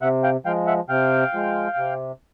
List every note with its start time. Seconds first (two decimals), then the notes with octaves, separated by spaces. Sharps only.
0.02 C3 E5 F#5
0.23 F5 G5
0.46 F3 G#3 F5 G5
0.67 E5 F#5
0.89 C3 F5 G5
1.33 F3 G#3
1.77 C3